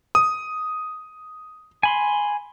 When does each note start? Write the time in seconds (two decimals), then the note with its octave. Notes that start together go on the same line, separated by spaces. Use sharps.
0.15 D#6
1.83 G#5 B5 C6